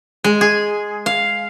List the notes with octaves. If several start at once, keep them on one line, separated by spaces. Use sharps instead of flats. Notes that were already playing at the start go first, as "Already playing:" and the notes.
G#3
G#4
F5